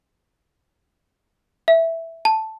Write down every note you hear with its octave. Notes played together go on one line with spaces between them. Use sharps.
E5
A5